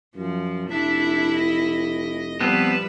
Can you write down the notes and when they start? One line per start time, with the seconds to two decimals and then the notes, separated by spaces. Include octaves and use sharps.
0.16 F#2 F3
0.70 F1 D4 E4 E5
1.36 D#5
2.41 F3 G3 B3 C4 B4 A5